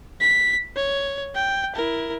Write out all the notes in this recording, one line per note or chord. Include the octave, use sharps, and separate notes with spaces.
B6
C#5
G5
E4 A#4